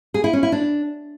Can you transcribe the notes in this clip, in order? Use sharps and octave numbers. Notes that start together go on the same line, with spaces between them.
G#4
E4
C#4
E4
D4